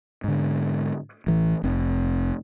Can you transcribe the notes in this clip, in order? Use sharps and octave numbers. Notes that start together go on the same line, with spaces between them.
G#2 D3
A1 E3
F1 C4